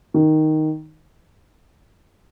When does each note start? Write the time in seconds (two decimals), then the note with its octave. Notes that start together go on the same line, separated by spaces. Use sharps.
0.14 D#3